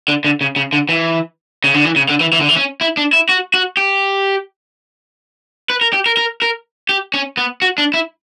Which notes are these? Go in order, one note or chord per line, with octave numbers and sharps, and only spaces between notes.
D3
D3
C#3
C#3
D3
E3
C#3
D3
E3
C#3
D3
E3
E3
D3
E3
C#4
E4
D4
E4
F#4
F#4
G4
B4
A#4
G4
A#4
A#4
A#4
G4
C#4
B3
F#4
D4
E4